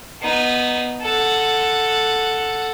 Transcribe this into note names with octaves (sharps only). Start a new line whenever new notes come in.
B3 D#4
A4 F#5